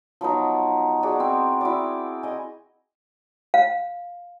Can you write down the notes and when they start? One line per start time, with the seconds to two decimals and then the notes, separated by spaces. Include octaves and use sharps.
0.21 F3 F#3 B3 D#4
1.03 F#4 G#4 D5
1.20 C4 E4
1.61 E4 F#4 D5
2.23 D#5 G#5
3.54 F5